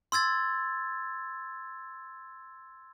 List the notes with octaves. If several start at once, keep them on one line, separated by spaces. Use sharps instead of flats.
C6 E6 G#6 A6